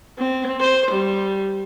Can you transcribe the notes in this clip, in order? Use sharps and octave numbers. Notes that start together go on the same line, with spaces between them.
C4
C5
G3